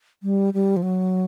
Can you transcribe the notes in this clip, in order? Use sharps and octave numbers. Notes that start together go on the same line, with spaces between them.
G3
G3
F3
F#3